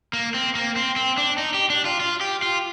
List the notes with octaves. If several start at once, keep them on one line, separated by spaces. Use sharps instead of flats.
A#3
C4
A#3
C4
C4
D4
D#4
G4
D4
F4
F4
G4
F4